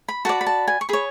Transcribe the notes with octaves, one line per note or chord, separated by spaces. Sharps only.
B5
F#4 B4 D5 A5
B5
A5
G#5
C#6
G#4 C#5 B5